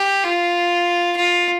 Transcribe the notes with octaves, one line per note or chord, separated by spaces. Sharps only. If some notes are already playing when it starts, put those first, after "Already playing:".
Already playing: G4
F4
F4